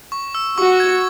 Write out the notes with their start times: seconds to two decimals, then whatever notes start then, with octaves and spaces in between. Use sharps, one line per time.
0.12 C#6
0.35 E6
0.57 F#4 C#6
0.80 G#6